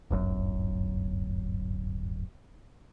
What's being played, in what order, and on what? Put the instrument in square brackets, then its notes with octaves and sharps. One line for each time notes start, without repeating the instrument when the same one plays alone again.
[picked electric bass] D1 G1 F#2